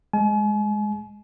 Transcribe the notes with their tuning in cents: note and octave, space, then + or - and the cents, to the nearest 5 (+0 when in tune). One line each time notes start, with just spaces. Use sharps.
G#3 +0 G#5 +40